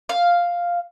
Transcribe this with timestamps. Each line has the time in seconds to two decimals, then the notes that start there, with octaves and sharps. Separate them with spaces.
0.09 F5